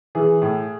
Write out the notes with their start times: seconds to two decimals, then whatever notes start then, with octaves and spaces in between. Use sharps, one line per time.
0.15 E3 G#4
0.42 A2